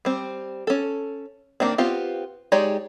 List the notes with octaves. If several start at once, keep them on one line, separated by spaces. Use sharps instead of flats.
G3 C4
C#4 A4
D#3 A#3 C4 D4
B3 C4 F4 G4
G#3 D#4 G4 C#5 D5